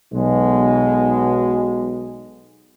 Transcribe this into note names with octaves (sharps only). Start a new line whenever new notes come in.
B1 B2 G#3